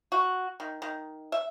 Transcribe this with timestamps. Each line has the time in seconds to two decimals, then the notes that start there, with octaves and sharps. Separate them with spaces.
0.12 F#4
0.60 D#3
0.82 D#3
1.32 E5